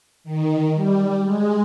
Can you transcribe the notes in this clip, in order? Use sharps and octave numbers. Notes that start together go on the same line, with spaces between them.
D#3
G3
G#3